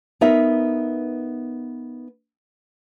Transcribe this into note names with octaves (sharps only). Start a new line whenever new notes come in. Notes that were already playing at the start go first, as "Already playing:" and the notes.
B3 D#4 A#4 E5